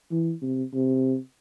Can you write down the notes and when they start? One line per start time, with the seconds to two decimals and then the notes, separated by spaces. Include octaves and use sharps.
0.11 E3
0.42 C3
0.73 C3